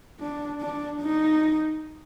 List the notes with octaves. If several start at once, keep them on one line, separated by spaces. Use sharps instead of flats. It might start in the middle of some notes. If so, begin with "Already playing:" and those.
D4
D4
D#4